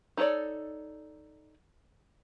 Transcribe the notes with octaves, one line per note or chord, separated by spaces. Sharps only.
D#4 A4 A#4 C#5 D5